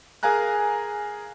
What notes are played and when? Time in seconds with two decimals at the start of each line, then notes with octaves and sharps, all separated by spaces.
0.23 G#4 A#4 F5 G#5 A#5 F#6